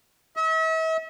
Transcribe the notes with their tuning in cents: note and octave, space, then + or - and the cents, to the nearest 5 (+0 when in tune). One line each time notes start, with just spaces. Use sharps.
E5 -40